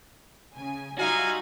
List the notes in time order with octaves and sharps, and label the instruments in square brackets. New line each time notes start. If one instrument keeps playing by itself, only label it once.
[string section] C#3 G#5
[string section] G3 D#4 F4 [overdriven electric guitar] F#4 [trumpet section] E5 F5 G#5